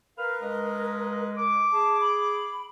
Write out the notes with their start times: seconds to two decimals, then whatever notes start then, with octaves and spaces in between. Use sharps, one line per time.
0.18 A#4 B4 F5 F6
0.41 G2 G#3 B4 D#5
1.37 D6
1.72 G#4 A5
2.01 B5